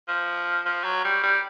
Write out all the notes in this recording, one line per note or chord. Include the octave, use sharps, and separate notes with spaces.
F3
F3
F#3
G3
G3